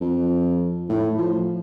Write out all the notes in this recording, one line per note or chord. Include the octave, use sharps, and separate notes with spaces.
F2
A2
F3